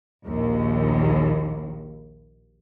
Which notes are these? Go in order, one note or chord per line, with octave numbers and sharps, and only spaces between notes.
A#1 D#2